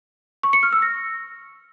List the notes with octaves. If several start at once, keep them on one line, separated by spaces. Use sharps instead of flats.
C#6
C#7
F6
E6
A#6